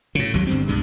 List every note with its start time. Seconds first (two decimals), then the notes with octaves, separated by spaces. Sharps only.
0.15 A2 C#3
0.33 G#1 D#2 F#3 G3
0.47 G1 G2 C4
0.68 C2 G2 B2 G#3